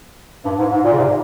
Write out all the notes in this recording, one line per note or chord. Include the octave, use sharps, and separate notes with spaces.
G2
G#2
G#2
A#2
C#3
G#2 C3